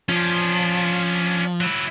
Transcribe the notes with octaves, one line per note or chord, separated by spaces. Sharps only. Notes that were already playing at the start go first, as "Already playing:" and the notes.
F3 C#4 D4
F#3 E4